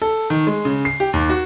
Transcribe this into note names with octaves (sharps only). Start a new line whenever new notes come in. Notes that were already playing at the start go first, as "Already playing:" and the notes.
A4
D#3
G#3
C#3
C7
G4
D#2
F#4